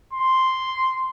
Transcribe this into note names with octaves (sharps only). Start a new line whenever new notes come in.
C6